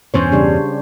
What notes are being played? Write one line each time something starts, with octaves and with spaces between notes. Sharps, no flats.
E2 G2 B2 C#4 C5 C#5
C#3 G3 D4